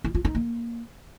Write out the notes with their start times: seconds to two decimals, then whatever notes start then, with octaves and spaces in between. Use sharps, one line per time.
0.04 E4
0.15 F4
0.25 D#4
0.35 A#3